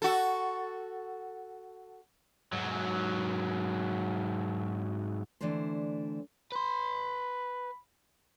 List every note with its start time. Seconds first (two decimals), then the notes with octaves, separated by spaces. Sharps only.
0.02 F#4 A4
2.53 G#2 F#3
5.41 D3 E3 A3 C4 D4 C5
6.52 B4 B5 C6